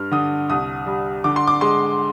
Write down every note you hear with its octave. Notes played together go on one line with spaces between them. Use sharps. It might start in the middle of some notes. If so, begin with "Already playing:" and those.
Already playing: G2 F6
D3 D#6
C2 D#6
G3
D3 D6
C6
D6
G#3 C6